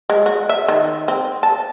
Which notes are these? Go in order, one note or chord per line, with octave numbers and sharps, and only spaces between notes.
G#3
F#4
E5
D#3
C4
A5